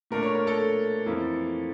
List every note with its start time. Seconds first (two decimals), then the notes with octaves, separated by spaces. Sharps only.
0.11 A#2 A3 D4 A#4
0.22 C#5
0.35 A#4
0.47 A4
1.06 F2 E3 A#3 E4